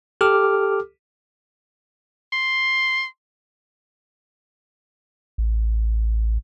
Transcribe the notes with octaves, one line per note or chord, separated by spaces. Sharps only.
G4 A4 D6 F6
C6
A1